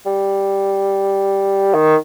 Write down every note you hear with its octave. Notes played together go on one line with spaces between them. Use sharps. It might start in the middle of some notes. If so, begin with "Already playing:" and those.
G3
D#3